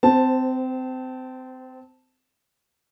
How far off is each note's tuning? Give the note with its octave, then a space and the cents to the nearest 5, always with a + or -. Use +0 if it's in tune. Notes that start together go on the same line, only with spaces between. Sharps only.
C4 -25 C5 +0 A5 +0